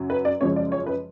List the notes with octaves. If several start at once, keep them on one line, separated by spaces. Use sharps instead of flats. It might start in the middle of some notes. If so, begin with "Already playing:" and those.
Already playing: F#2 C#3 F#3
B4
D5
F#2 C#3 F3 G#3 C#5
D5
C#5
B4